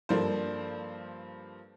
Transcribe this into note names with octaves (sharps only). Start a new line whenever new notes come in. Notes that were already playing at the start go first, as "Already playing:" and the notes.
G2 F3 A#3 D4 A4 C5